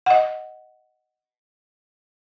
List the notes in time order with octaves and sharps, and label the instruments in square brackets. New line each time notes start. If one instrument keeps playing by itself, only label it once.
[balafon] D#5 F#5